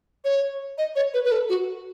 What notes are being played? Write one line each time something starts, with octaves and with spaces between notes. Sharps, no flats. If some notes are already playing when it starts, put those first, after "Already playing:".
C#5
D#5
C#5
B4
B4
A4
F#4